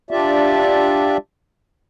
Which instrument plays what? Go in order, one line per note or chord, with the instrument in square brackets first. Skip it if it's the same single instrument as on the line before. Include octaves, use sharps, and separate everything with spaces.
[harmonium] D4 F4 G4 D5 E5